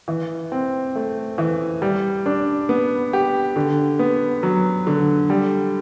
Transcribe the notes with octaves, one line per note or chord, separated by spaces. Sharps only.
E3
C4
A3
E3
G3
D4
B3
G4
D3
B3
F#3
D3
G3